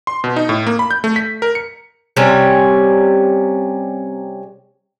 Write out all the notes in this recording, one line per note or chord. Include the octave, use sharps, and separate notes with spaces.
C6
B2
D#4
A2
A#3
B5
G6
A3
B6
A#4
C#7
C3 G3 C#4